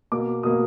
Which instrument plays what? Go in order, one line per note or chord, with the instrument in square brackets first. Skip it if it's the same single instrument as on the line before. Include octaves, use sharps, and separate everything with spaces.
[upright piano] B2 A#3 D6
B2 A#3 D#6